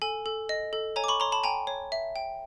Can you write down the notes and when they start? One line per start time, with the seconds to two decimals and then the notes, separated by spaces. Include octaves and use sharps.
0.02 A4 G#5
0.26 A4
0.49 D#5
0.73 A4
0.96 C#5 G#5 A#5
1.04 D6
1.08 B5 C#6
1.20 C#5 A#5 C6
1.32 A5 B5
1.43 G5 G#5 A#5
1.67 C#5
1.92 E5
2.16 G5